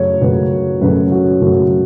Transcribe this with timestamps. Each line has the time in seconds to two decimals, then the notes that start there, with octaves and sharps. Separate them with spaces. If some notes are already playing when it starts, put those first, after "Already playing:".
Already playing: F#2 C#3 F#3 A3 C#5
0.21 F#2 C#3 F#3 A3 B4
0.81 F#2 C#3 F#3 A3 B4
1.12 F#4
1.41 F#2 C#3 F#3 A3 F#4